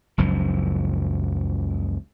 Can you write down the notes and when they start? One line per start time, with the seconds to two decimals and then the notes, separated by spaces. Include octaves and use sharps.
0.18 F#1 C#2 F#2 F3